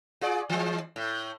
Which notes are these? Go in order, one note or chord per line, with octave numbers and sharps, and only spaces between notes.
F4 G#4 D5
E3 G#3
A2